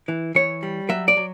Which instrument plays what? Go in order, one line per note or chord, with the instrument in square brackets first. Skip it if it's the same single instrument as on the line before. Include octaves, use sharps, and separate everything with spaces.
[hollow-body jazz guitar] E3
E3 C#5
G3
F#3 E5
D5
F#3